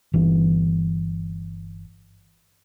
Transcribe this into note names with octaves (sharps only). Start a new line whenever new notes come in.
G1 E3